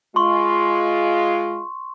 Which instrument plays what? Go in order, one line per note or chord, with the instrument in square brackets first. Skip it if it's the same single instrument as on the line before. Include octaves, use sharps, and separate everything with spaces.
[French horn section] G#3 F4 [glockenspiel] C6 C#6